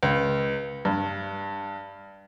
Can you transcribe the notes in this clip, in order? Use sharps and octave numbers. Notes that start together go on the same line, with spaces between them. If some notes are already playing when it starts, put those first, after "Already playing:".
C#2
G2